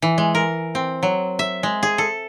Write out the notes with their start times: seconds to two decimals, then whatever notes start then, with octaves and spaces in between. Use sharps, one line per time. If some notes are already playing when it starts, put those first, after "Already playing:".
0.02 E3
0.18 G#3
0.35 A#4
0.75 C4
1.03 F#3
1.39 E5
1.63 G#3
1.83 G#4
1.98 A4